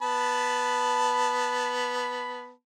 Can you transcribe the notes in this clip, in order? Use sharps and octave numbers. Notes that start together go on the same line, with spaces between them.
B3 A5 B5